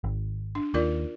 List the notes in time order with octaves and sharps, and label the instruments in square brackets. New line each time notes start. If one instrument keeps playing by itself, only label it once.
[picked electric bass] G#1
[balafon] D4
[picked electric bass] D#2 [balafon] F4 A#4 D5